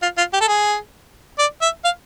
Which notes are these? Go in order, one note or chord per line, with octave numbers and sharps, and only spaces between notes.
F4
F4
G4
A4
G#4
D5
E5
F5